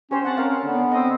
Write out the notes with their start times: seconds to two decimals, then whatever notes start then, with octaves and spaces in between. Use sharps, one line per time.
0.11 C#4 G4 C5
0.25 C4 F#5 A5
0.37 C#4 A#4 F5
0.64 D3 B3
0.92 C4 D#5